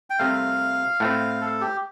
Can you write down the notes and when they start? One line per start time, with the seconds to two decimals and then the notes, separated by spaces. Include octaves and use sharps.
0.10 G5
0.19 C2 C3 A3 F5
1.00 A2 A3 C4
1.41 A4
1.61 G4